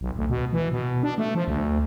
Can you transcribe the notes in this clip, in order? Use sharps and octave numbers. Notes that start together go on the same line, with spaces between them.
B1
D2
B2
E3
B2
D4
A3
F3
D2